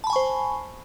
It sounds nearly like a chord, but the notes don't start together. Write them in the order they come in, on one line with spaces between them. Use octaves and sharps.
A5 B5 G#5 C#6 C5